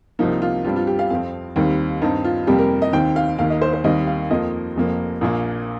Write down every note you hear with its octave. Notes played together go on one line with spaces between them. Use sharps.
C2 C3 F3 A#3 D#4
F4
G2 G3 C4 F4
F4
G4
F5
F2 F3 C4 F5
D#2 D#3 G3 C4
G2 D#3 C4 D#4
F4
F2 C3 G3 A#3 G4
A#4
D#5
D#2 D#3 C4 G5
F5
D#2 D#3 A#3 F5
D#5
C5
C5
D#2 D#3 G3 C4 D#5
F5
F2 F3 A#3 D#5
F1 F2 F3 A#3
A#1 A#2 A#3